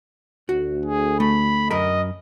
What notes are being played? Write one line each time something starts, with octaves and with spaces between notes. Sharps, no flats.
D2 F#4
G#4
A3 B5
F#2 A#4 D#5 B5